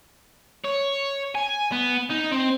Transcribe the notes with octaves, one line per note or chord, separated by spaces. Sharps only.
C#5
G#5
B3
D#4
C4